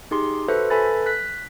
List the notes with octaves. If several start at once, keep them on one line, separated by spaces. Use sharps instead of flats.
D#4 G4 G#4 C6
F#4 A4 B4 C5 E5
A4 B4 E5 G#5 B5 A6
F#6 B6